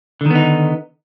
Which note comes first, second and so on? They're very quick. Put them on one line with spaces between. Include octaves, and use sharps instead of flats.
D3 D#3 B3 D#4